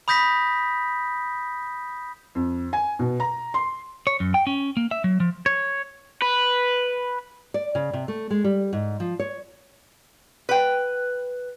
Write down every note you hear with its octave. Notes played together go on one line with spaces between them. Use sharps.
B5 D#6 G6 A#6 B6
F2
G#5
B2
A#5
C6
C#5
F#2
G5
C#4
A#3
E5
F#3
F3
C#5
B4
D5
C#3
C3
A3
G#3
G3
G#2
F3
C#5
B4 G5